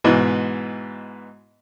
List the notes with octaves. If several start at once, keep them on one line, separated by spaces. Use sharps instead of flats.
G#2 B2 E3